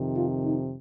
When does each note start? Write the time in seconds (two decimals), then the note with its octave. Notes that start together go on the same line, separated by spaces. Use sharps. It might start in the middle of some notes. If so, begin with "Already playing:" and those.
Already playing: F2 C3 D#3
0.16 F4
0.45 D#4